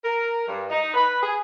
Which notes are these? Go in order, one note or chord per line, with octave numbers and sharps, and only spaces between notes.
A#4
G2
D#4
B4
G#4